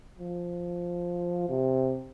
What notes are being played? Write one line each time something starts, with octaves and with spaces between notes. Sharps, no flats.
F3
C3